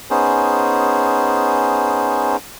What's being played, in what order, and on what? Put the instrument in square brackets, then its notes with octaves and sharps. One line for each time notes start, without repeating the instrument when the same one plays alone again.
[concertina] B3 C#4 D#4 G#4 C5